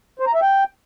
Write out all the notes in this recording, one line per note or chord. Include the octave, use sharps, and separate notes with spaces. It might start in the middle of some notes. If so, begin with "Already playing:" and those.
C5
A#5
E5
G5